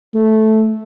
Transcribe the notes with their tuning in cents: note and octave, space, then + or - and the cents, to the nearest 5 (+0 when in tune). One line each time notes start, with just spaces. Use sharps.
A3 -10